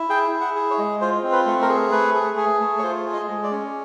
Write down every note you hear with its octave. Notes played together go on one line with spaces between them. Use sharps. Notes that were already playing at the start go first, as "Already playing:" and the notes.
Already playing: E4
G#4 G5
E4
F#5
G#4
C#5
G#3
F4 C5
C4
B4
A3
A#4
G#4
A3 B4
G#4
G#4
A3
C#5
F4 C5
G#4
D#5
G#3
D5
C#4